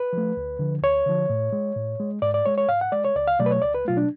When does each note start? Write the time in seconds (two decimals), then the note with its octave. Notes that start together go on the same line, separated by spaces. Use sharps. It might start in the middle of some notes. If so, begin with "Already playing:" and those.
Already playing: B4
0.13 F3 A3
0.37 D2
0.59 D3 F3
0.82 D2 C#5
1.06 D3 F3
1.30 A2
1.53 G#3
1.76 A2
1.99 G#3
2.22 G#2 D5
2.34 D5
2.46 G#3 C#5
2.58 C#5
2.69 G#2 F5
2.81 F#5
2.92 G#3 D5
3.04 C#5
3.16 C#2 D5
3.27 F5
3.39 B2 F#3 A3 D5
3.46 B4
3.51 C#5
3.62 C#2 D5
3.75 B4
3.85 B2 F#3 A3 F4
3.97 D4